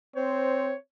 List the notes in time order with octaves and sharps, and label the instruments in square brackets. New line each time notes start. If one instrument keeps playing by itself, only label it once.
[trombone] C4 [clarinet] C5 [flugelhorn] C#5